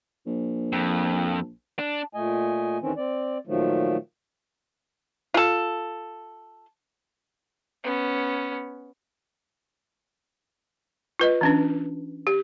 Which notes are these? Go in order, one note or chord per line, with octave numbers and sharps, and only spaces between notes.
A#1
F2
D4
A#2 A3 D#5 G#5
D#2 D#3 E3 C4 C#4
C4 D5
A#2 D#3 F3 F#3 A3
F4 A4
B3 C#4
F4 B4 D#5
E3 C#4 D4
G4